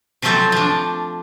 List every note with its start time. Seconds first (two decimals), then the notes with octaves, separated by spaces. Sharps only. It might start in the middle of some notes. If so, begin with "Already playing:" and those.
0.22 C3 F3 F#3 A3 C4 A4
0.52 F3 D4